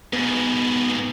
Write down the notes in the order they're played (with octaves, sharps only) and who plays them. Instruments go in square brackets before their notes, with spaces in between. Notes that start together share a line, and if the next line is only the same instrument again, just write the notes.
[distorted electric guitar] G#2 B2 [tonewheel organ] B3